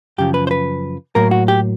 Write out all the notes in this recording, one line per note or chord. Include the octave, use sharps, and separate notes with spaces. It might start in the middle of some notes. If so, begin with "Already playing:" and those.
F#2 C#3 F3 G4
B4
C5
B4
A2 F#3 A#3 A#4
F#4
G4